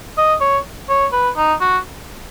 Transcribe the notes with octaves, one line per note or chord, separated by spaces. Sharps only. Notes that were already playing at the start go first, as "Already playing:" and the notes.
D#5
C#5
C#5
B4
D#4
F#4